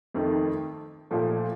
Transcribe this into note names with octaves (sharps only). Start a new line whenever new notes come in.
F2 D#3 A3
A#2 F3 A3